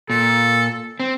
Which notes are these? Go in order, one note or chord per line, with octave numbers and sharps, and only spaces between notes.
A#2 A4
C4